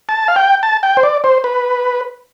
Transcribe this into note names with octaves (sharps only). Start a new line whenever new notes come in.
A5
F5
G5
A5
G5
C5
D5
C5
B4